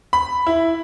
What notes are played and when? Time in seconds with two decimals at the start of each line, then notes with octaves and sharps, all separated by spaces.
0.13 B5
0.47 E4